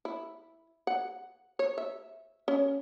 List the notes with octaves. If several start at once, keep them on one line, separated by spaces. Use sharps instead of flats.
E4
F#5
C#5
E5
C#4